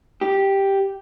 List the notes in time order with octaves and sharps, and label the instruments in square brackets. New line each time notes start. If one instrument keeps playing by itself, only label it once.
[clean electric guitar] G4